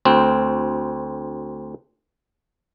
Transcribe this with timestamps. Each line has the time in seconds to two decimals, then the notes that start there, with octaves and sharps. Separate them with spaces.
0.05 D2 C4